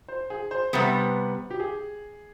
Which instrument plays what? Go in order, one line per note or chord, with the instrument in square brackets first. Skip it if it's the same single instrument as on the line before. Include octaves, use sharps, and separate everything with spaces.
[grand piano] C5
G#4
C5
[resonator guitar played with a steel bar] C3 G3 B3 [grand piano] B4
[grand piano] G4
G#4